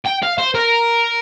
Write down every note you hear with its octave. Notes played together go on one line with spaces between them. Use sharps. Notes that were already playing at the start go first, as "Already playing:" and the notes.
G5
F5
C5
A#4